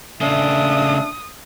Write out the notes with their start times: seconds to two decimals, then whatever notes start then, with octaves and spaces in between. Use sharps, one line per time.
0.21 C#3 A3 D4 E5 D#6